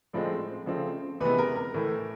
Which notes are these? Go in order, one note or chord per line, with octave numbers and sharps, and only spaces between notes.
A2 F3 G#3 C4
C#3 F3 A3 C4
C3 E3 G#3 B3 B4
A#4
A#4
A2 E3 A3